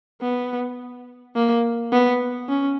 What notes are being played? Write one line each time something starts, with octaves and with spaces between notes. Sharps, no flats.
B3
A#3
B3
C#4